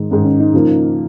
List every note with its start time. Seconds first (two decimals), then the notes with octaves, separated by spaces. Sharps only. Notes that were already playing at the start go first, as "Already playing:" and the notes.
Already playing: G#2 D#3 G#3 D#4
0.11 G#2 D#3 G#3 C#4 D#4
0.25 C#4
0.40 D#4
0.53 C#3 F3 A#3